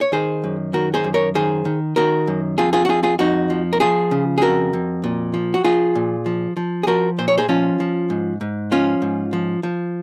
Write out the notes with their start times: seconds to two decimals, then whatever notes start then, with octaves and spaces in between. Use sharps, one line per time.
0.01 C#5
0.12 D#3 G#4 C5
0.44 F#2
0.73 D#3 F#4 A#4
0.94 G#4 C5
1.04 F#2
1.14 A#4 C#5
1.35 D#3 G#4 C5
1.65 D#3
1.96 D#3 F#4 A#4
2.27 F#2
2.58 F2 F4 G#4
2.73 F4 G#4
2.85 F#4
2.88 F2 F4 G#4
3.03 F4 G#4
3.19 F2 D#4 F#4
3.50 F3
3.73 A#4
3.80 F3 F4 G#4
4.11 C#3
4.38 G#4
4.41 F2 F#4 A#4
4.73 F2
5.04 A#2
5.34 F3
5.54 F#4
5.64 F3 F4 G#4
5.95 A#2
6.26 F3
6.57 F3
6.83 G#4
6.87 F3 F#4 A#4
7.18 A#2 C5
7.28 C#5
7.38 G#4 C5
7.49 F3 C#4 F4
7.80 F3
8.10 G#2
8.41 G#2
8.71 F3 C#4 F4
9.02 G#2
9.33 F3
9.63 F3